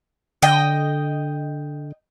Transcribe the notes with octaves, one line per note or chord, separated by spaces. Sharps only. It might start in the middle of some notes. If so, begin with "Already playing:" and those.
D3 D#5 G5